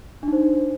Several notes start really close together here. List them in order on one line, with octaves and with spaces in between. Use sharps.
D4 D#4 C5